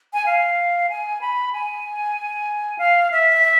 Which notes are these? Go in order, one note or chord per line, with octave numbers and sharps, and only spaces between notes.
G#5
F5
G#5
B5
G#5
F5
E5